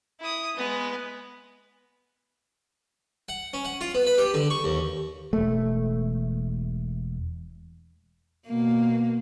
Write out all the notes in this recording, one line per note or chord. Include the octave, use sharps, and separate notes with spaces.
E4 D#6
G#3 B3
F#5
C#4
F#5
F4
B3
B4
G4
D3
C#6
D#2
E1 A3
B2 A#3